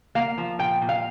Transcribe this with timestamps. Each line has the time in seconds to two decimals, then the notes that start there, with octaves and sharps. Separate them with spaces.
0.15 A#3 F5
0.38 F3
0.59 A#2 G5
0.82 A#2
0.89 F5